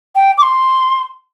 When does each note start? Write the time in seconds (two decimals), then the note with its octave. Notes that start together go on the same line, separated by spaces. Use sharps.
0.16 G5
0.38 D6
0.42 C6